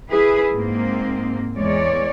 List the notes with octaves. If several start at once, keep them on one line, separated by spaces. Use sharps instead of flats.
E4 G#4 B4
G#2 A#3 C4
E2 G#3 C#5 D5